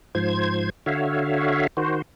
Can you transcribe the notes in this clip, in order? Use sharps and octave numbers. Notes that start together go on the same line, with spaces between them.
G#2 F3 C5 G#6
D3 F#4 C#5 E5 F5
D#3 F#4 C5